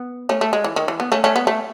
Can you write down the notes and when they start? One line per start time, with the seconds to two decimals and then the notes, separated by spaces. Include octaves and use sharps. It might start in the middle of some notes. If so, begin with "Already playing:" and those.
Already playing: B3
0.29 A3 C#4
0.41 A3
0.53 G#3
0.64 E3
0.76 D#3
0.88 E3
1.00 B3
1.12 A3 C#4
1.24 A3 C#4
1.36 B3
1.47 A3